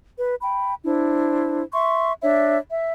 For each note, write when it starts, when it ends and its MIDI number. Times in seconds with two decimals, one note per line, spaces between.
0.17 0.34 71
0.41 0.74 79
0.41 0.74 83
0.84 1.62 62
0.84 1.62 64
0.84 1.62 72
1.72 2.11 76
1.72 2.11 84
1.72 2.11 85
2.21 2.57 62
2.21 2.57 73
2.21 2.57 76
2.70 2.92 76